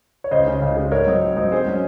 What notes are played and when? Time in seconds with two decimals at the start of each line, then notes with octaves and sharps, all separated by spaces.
0.24 C#5
0.31 C#2 C5 D#5
0.46 C#3 G#3 C#4
0.62 C#2
0.77 C#3 G#3 C#4
0.91 G#2 A#4 C#5
1.07 F#3 C4 D#4
1.22 G#2
1.37 F#3 C4 D#4
1.52 G#2 G#4 C5
1.67 F#3 C#4